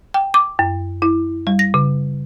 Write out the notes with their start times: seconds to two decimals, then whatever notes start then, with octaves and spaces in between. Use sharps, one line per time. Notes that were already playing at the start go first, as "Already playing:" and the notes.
0.14 G5
0.34 D6
0.59 F#2
1.02 E4
1.47 G3
1.59 A#6
1.74 C#3